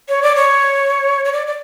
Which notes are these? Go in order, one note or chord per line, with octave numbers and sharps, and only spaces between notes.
C#5
D5
C#5
C#5
D5
D5